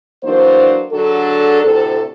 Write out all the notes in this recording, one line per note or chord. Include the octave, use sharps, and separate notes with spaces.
E3 F#3 A#3 D4 C5
D3 F#3 D4 G#4 A4
D2 A2 C3 A4